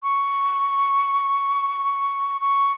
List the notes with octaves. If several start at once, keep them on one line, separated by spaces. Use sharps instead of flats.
C#6
C#6